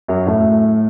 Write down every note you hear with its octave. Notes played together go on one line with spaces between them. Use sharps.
F#2 F#3
A2 A3